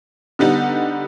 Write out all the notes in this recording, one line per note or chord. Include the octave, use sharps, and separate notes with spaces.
D3 G3 B3 D#4